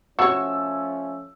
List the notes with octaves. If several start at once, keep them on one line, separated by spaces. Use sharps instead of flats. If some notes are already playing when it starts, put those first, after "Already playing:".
F3 A3 C#4 F#4 C#5 E6